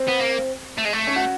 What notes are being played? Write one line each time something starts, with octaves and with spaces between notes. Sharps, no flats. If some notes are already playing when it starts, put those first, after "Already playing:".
Already playing: C4
B3
A#3
A3
G#3
A3
C#4
F#4